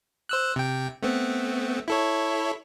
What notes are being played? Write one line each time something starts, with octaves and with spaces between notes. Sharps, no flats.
C5 E6 F#6
C3 G5
A3 B3 C4
E4 A4 C#5